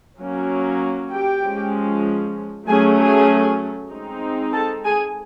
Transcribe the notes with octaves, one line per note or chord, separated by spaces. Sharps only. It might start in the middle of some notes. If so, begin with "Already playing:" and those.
F#3 A#3 C#4
G4 G5
F3 G#3 C#4
F#3 A3 C#4 G#4 G#5
G#4 G#5
G#3 C4 D#4
A4 A5
G#4 G#5